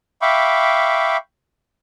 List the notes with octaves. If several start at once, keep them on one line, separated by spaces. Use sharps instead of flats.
E5 F5 G5 B5 C#6 D6